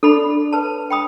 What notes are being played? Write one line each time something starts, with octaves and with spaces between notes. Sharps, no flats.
D4 A4 B5
B4 A5
G5 B5 D#6